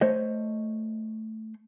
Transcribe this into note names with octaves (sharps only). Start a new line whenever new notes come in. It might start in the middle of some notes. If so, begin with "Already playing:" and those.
A3 C5 C#5 D#5